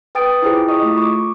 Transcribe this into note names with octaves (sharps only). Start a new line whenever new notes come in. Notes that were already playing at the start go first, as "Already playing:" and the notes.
B4 G5 D#6 A6 D7
E4 F4 G4 G#4 C5 G5
D6
E4 D#5 C#6 D#6
A3 F4
C#6 D6